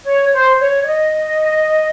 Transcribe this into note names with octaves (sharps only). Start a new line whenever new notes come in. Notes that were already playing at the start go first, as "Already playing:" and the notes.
C#5
C5
C#5
D5
D#5